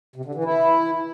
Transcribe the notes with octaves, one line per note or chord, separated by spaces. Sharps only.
C3
D3
E3
E4